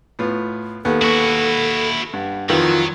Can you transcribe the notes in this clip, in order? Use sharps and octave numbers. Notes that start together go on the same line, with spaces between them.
A2 B3 F4
D#2 B3 A4 F#5
D#2 B3 E4 F#4 C#6
G2 F#5
F2 D#3 E3 F#3 F4